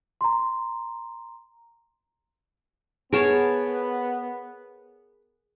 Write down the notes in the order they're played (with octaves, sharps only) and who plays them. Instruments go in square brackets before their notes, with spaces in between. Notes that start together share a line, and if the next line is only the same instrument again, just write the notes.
[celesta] A#5 C6
[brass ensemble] B3 [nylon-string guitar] G#4 [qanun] A#4 C#5 A5